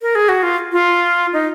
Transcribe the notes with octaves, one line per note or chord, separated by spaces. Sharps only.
A#4
G#4
F#4
F4
F4
D#4